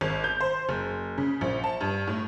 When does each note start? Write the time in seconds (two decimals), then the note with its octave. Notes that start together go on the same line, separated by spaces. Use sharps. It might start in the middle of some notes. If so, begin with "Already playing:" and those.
0.01 G#1
0.24 G6
0.40 C5
0.69 F#1
1.18 C#3
1.41 A#1
1.64 A5
1.81 G2
2.07 A2